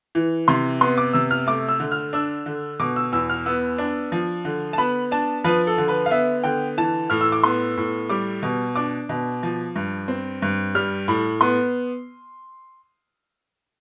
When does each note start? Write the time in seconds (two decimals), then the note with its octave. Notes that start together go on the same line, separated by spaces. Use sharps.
0.15 E3
0.48 C3 C6
0.81 B3 C6
0.98 D6
1.13 C3 E6
1.31 F6
1.47 A3 D6
1.69 E6
1.80 D3
1.92 F6
2.13 D4 E6
2.46 D3
2.80 B2 D6
2.96 E6
3.12 E2 E6
3.30 F6
3.46 B3 E6
3.78 D4
4.12 F3
4.45 D3
4.73 A5
4.78 B3 B5
5.11 D4 A5
5.44 F3 B4
5.67 A4
5.78 D3
5.88 B4
6.06 F5
6.10 B3 E5
6.44 D3 G5
6.77 E3 A5
7.10 A2 F6
7.21 E6
7.32 D6
7.44 B3 C6
7.77 A2
8.10 G3 D6
8.43 B2
8.75 D4 D6
9.09 B2
9.43 F3
9.76 G2
10.08 C4
10.42 G2
10.75 G3 F6
11.08 A2 B5
11.41 B3 C6